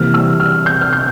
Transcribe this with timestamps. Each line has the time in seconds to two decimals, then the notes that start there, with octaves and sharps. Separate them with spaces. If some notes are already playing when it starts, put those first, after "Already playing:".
Already playing: C3 E3 G3 A#3 F6
0.14 E6
0.40 F6
0.66 G6
0.82 F6
0.93 G6